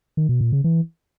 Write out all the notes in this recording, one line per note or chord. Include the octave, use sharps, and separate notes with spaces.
D#3
B2
A#2
C#3
E3